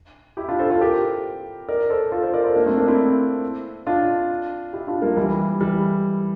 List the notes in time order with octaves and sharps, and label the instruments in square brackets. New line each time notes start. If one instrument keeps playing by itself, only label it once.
[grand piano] E4 G4
D4 F4
A4 C5
F4 A4
G4 A#4
A#4 D5
A4 C5
F4 A4
A4 C5
A#4 D5
A4 C5
A#3 D4
A3 C4
A#3 D4
C4 E4
D4 F4
E4 G4
D4 F4
G3 A#3
E3 G3
E3 G3